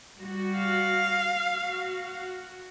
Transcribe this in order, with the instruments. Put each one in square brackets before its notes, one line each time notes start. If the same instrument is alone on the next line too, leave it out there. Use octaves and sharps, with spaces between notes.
[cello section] G3 F#4
[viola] F5
[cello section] F#4